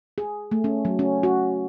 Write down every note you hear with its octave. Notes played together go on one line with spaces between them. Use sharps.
G#4
A3
C#4
F#3
C#4
F#4